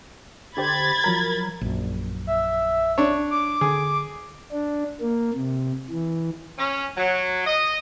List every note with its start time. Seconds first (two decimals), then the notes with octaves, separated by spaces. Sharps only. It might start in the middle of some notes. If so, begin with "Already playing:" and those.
0.57 D3 G4 C5 B5 G#6 A6
1.04 F3 F#3 A#4
1.61 A#1 F#2
2.27 E5
2.98 D4 C#5
3.30 D6
3.61 D3 G#4
4.52 D4
5.01 A#3
5.33 C3
5.90 E3
6.58 C#4
6.97 F#3
7.47 D#5